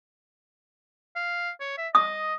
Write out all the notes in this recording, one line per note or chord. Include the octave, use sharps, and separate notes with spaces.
F5
C#5
E5
D#5 D#6